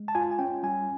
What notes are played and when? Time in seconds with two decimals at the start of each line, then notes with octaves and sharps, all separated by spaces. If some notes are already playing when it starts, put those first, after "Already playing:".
Already playing: G#3
0.08 A5
0.15 F4 G#5
0.31 G#5
0.39 C#4 G5
0.63 G3 G#5